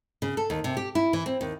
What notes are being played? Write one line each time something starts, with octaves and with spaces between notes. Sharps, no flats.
C#3
A4
D#2
C3
G4
E4
E3
C4
D#2